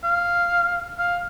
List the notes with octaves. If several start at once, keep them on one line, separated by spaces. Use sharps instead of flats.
F5
F5